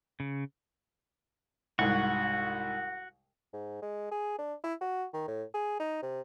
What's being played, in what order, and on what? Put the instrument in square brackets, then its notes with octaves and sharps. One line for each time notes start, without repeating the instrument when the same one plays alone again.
[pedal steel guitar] C#3
[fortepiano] C2 G#2 [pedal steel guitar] F#4 F#5 C#6
[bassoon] G#2
G#3
G#4
D4
E4
F#4
D#3
A2
G#4
D#4
C3